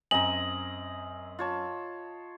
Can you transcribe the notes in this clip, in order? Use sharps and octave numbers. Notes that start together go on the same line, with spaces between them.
F#2 C4 D#5 G#5 A#5 F#7
F4 C#5 A5